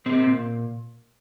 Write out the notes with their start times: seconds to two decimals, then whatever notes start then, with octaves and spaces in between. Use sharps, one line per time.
0.06 A#2 C4
0.27 A#2